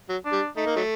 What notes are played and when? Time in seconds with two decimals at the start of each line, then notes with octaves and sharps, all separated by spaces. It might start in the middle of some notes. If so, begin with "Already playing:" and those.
0.09 F#3
0.25 D4
0.32 G3
0.56 A3 D#4
0.66 A#3
0.76 F#3 A3